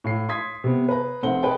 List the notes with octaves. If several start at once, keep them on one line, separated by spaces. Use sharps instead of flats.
A2 F5 C7
C6 D#6 G#6 B6
C3 B3
B4 A#5
F1 A3 C4 C5 F#5 G7
G#4 A#4 B4 D#5 G5 A5